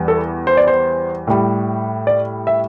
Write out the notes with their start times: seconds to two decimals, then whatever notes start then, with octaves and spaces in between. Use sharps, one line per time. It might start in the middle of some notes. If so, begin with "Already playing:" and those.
Already playing: E2 E3 G3
0.08 A4
0.47 C5
0.57 D5
0.68 C5
1.27 A2 G3
2.07 D5
2.47 E5